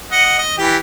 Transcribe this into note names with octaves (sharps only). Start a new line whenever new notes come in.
D#5 F#5
D#5
E3 G4